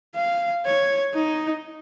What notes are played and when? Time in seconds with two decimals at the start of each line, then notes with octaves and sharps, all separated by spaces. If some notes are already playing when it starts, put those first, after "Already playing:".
0.15 F5
0.65 C#5
1.15 D#4